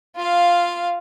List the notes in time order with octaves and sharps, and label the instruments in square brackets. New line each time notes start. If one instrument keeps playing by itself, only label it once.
[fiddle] F4 F5